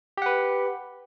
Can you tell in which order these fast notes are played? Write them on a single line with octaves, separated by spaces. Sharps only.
G4 F#5 B4